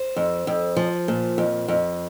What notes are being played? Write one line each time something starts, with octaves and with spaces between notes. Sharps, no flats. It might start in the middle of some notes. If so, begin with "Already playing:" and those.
Already playing: C5
F2
F2
F3
A#2
F2
F2